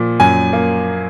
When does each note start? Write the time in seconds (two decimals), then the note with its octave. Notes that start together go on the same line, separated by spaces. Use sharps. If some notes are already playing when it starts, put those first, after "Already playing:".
Already playing: A#2 F3
0.20 F#2 G#5
0.53 A#3